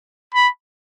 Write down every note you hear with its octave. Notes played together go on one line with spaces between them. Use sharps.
B5